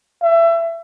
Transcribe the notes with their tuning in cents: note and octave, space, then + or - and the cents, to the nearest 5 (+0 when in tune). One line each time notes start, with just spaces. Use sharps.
E5 +25